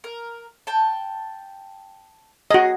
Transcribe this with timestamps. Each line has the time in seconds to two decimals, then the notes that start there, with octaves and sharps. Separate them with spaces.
0.04 A#4
0.67 G5 A5
2.51 F#4 G#4 D#5